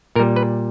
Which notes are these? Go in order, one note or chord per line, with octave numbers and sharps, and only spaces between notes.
A#2 G3 A#4
B4